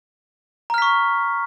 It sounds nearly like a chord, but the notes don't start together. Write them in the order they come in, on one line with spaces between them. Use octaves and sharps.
A#5 F6 B6 C#6